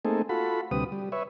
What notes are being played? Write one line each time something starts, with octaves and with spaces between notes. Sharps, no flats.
A3 A#3 C4 D#4 G#4 A4
F4 F#4 A4 B5
D2 C3 G3 B4 D#6
G3
B4 C#5 E5